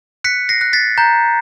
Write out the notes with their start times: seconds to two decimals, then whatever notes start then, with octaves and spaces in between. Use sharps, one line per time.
0.24 F#6 B6 C#7
0.49 A#6 C7
0.61 F#6
0.73 A6 B6
0.98 A#5 G6